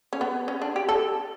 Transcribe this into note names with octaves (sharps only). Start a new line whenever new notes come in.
C#4
B3
C#4
D4
G4
A4